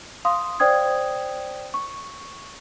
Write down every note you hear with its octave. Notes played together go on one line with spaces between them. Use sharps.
F5 C6 D#6
C5 D5 G5 D#6 G#6
C#6